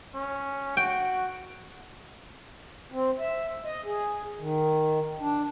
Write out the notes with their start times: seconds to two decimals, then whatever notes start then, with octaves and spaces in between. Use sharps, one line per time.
0.15 C#4
0.77 F#4 G5
2.92 C4
3.19 E5
3.65 D#5
3.84 G#4
4.39 D#3
5.20 D4